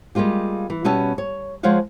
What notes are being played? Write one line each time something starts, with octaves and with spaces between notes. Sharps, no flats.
G3 G#3 A#3 F4 G4
E3
B2 G3 B3 C#4 E5 A5
C#5
F3 G#3 C5 C#5 F5 F#5